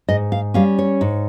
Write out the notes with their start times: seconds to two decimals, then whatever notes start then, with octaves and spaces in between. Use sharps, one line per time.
0.08 G#2 D#5
0.32 F5
0.54 G3 C#4 F5
0.79 C#5
1.01 G#2